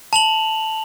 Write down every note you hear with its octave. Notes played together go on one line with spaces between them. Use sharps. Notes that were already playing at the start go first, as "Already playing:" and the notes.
A5 F7 F#7